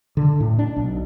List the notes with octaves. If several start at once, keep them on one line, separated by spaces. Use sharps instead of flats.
D3
A2
D4
B1